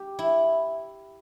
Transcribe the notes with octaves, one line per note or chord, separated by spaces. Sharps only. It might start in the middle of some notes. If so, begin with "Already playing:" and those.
Already playing: G4
E4